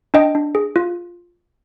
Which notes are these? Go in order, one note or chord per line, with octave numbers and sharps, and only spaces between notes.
D4 D#5 G5
D4
G#4
F4